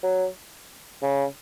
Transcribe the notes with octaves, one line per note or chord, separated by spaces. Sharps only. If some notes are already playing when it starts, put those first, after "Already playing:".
F#3
C#3